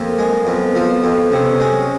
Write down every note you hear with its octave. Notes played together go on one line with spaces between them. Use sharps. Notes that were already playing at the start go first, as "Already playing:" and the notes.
Already playing: F2 F3 A#3
G#3
F2 B3
F3
F2
C3 C#4
G#3